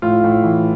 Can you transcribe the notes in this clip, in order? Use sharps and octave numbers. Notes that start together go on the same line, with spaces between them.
A2 F4
A2
E3